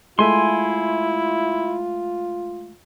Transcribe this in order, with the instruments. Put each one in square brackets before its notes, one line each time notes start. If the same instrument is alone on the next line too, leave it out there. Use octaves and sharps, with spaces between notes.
[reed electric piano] G#3 A3 E5 [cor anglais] E4 [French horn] F4 [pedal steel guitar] G#5 C6